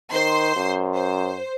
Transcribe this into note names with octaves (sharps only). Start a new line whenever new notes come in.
D#3 C5 C6
F#2
C5